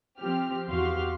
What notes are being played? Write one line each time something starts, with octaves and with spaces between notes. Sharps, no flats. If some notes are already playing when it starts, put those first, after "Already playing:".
F3 C4 G4 F6
E2 F#4 G4 F5 C6 F6